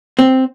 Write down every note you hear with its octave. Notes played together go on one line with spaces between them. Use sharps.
C4